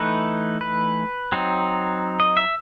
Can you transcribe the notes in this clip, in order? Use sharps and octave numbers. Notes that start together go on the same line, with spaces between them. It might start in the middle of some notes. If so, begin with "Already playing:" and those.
Already playing: E3 A3 D#4 B4
B4
F#3 C4 D#4
D#5
E5